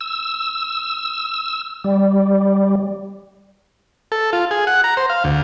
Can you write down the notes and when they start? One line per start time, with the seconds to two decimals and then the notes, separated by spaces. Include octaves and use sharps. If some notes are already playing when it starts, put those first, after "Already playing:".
0.01 E6
1.84 G3
4.12 A4
4.33 F4
4.51 G#4
4.67 F#5
4.84 A#5
4.97 C5
5.10 F5
5.24 D2